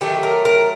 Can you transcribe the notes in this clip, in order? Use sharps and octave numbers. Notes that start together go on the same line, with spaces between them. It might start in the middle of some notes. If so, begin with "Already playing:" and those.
D#3 F#3 A3 G4
A#4
A#4